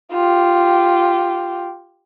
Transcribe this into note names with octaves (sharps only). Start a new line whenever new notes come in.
F4 G4